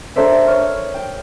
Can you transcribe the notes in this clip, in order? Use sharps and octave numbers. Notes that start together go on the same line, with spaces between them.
D4 A4 A#4 C5 D5 E5
C#5 C#6 F6
G5